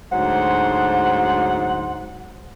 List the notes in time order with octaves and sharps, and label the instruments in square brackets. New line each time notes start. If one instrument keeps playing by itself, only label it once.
[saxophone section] D2 G#2 F#3 C5 F#5